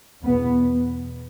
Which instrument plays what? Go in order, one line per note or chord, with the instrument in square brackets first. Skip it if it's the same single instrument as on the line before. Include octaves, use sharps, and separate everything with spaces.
[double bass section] E2 B2 B3